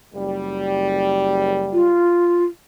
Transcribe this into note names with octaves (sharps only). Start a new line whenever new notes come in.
F#1 G3
F4